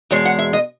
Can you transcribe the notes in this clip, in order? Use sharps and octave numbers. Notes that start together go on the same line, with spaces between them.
E2 B2 G#3 C#5
F#5
E5
D#5